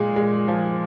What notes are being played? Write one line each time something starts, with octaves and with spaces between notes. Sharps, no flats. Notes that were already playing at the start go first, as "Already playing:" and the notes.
Already playing: A#2 G#3
G#3
F3